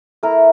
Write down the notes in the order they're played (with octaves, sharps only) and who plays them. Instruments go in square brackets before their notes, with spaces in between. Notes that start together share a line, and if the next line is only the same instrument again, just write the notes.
[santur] A3 E4 A#4